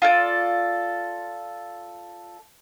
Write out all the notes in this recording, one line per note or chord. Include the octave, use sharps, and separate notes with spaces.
F4 A4 D5